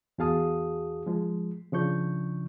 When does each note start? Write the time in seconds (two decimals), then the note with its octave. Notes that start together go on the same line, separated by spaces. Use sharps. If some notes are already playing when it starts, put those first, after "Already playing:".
0.18 E2 F#4 G#4 F5 A5 D#6
1.06 F3 G#3
1.72 C#3 F3 D4 C#6 G6